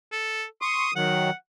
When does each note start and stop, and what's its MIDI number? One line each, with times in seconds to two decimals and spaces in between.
0.12 0.45 69
0.62 0.91 84
0.62 0.91 85
0.62 0.93 87
0.96 1.30 51
0.96 1.30 54
0.96 1.34 78